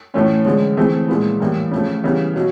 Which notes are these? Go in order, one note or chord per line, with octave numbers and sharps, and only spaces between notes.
A2 E3 A3 C#4 F4
D3 F3 G#3 C#4
E3 A3 C4 F4 G#4
A#2 F3 G#3 B3 E4
A2 E3 G3 A#3
C#3 F3 A3
C#3 E3 G3 B3
B2 F#3